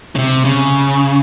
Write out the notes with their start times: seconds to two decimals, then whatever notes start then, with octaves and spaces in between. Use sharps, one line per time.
0.15 C#3
0.18 C3
0.45 C#3